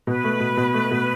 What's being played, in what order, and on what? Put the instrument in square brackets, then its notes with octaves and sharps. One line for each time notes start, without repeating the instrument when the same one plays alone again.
[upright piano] B2 [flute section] B4
[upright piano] A3
B2
B2
A3
B2